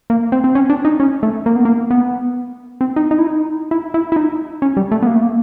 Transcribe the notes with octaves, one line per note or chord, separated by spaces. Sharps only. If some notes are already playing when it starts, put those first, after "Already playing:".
A#3
C4
C4
C#4
D4
D#4
C#4
A3
A#3
B3
A#3
B3
C4
D#4
D#4
E4
D#4
E4
E4
E4
D#4
C#4
G3
A3
B3
A#3
A3
A#3